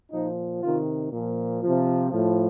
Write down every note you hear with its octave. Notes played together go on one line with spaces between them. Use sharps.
A#2 F3 D#4
C3 D#3 F4
A#2 F3
C3 F3
A2 F3